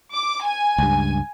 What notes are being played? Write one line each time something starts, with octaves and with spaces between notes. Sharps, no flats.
D6
G#5
C#2 G2